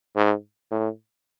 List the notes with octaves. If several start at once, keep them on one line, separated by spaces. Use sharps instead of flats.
G#2
A2